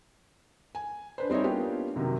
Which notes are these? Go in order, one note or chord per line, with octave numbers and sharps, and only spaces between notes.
G#5
D4 B4 C5
G3 C4 D#4 E4 C#5
A#3 B3 D4 F4 G4
F#2 C3 D#3 F#3